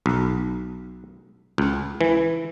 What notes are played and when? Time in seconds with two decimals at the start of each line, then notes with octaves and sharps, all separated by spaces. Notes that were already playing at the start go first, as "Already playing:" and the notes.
0.06 B1
1.58 C#2
2.01 E3